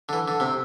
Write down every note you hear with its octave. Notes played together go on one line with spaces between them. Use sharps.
D3
E3
D3
C3